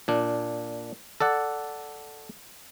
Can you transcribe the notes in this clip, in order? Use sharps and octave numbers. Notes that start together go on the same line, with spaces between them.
A#2 D4
A4 D5 F#5